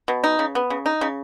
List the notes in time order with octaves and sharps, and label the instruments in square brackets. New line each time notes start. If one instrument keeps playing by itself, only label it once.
[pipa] B2
D#4
C#3
B3
C#3
D#4
C#3